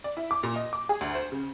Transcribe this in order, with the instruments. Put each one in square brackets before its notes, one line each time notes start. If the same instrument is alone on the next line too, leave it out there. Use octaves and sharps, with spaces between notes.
[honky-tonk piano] D5
E4
D6
A#2
D#5
D6
G#4
D2
C5
C#3